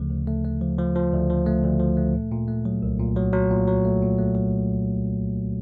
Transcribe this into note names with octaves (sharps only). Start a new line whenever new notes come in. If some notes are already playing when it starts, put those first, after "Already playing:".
Already playing: D2 C#3 F3 A3
D2
A3
A3
F3
F3
F3
D2
F3
A3
D2
F3
A3
A#2
A#2
A3
F#3
C2
A#2
F#3
F#3
A#2
F#3
A3
A#2
A3
F#3